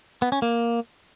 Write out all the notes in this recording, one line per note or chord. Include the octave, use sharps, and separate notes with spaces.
B3
C#4
A#3